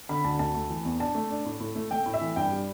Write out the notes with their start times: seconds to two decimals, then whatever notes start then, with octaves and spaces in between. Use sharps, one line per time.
0.09 D3 B5
0.24 D2 A5
0.39 D2 A5
0.54 A3
0.70 E3
0.85 E2
1.00 D4 A5
1.15 A3
1.30 D4
1.45 A2
1.60 A2
1.76 A3
1.91 A3 G5
2.06 A2
2.14 E5
2.21 E3
2.36 G2 G5
2.52 G3